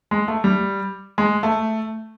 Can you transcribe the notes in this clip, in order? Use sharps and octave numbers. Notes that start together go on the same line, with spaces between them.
G#3
A3
G3
G#3
A3